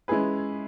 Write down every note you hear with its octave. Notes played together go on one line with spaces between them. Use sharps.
G#3 C#4 E4 G#4 B4